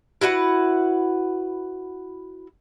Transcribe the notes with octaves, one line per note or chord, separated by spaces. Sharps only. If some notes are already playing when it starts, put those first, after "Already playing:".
E4 F#4 B4 F#5